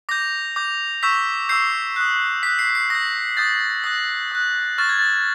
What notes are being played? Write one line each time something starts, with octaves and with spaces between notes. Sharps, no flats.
D6 G6 A#6
D6 G6
C#6 E6 G6 B6
C#6 E6 G6 C7
D#6 F#6
D#6 F#6 B6
C7
C7
D#6 G6 A#6
D#6 G6 A6
D#6 F#6 A#6
D#6 F#6
C#6 F6 A6
G#6
A6